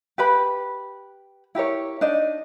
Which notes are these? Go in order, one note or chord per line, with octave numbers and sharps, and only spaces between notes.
G4 B4 B5
E4 G4 A#4 C#5
D4 D#4 D#5